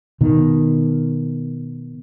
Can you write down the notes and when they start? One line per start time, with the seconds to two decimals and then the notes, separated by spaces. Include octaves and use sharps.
0.21 B2 D#3